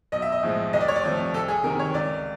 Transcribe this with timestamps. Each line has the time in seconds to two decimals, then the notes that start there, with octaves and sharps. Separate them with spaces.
0.12 B1 D#5
0.22 E5
0.32 D#5
0.43 A2 F3 G#3
0.73 C2 D#5
0.81 D5
0.88 C#5
0.96 D5
1.04 C3 F3 A3
1.34 C2 A4
1.48 G#4
1.64 C3 D#3 A#4
1.79 C#5
1.94 C#2 D5